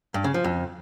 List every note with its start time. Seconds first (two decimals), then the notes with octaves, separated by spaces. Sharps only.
0.14 G2
0.24 C#3
0.34 F3
0.44 F2